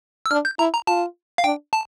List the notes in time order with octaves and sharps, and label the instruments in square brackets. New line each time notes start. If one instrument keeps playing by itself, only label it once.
[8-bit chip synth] E6
[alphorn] D4 [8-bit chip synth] F6
[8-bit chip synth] G6
[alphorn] E4 [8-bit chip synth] A#5
[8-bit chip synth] A#5
[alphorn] F4 [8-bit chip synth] A5
[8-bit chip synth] F5
[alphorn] D4 [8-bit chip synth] G5
[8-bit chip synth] A5